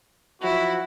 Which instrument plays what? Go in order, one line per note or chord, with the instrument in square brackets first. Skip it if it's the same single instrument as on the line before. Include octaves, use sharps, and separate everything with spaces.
[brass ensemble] F3 F#3 F#4 [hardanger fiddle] E4